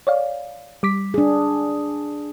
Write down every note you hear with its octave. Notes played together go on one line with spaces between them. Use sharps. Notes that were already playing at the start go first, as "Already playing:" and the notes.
C#5 D5 F5
G3 D6 B6
D4 G#4